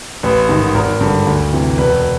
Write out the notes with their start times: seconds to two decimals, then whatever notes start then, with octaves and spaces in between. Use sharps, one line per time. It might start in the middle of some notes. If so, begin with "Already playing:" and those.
0.23 A1 B4
0.49 G#2 D#3
0.74 G#1 A#4
1.01 G2 D3
1.26 D2
1.53 C3 E3
1.78 E1 B4